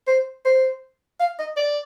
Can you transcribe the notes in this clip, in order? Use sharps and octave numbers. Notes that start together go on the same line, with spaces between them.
C5
C5
F5
D#5
D5